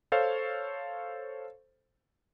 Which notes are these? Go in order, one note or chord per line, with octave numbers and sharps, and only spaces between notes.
A4 C5 C#5 F5